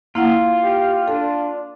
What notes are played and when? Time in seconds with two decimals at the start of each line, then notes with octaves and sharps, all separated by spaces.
0.15 A#3 E4 F4 F#5
0.63 G4
1.08 D4 A4